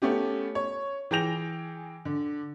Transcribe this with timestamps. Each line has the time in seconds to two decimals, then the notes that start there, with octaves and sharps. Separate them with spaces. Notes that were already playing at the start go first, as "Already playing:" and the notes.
0.02 A3 B3 C#4 G4
0.55 C#5
1.11 E3 G#4 G5 G6 A#6 F7
2.05 D3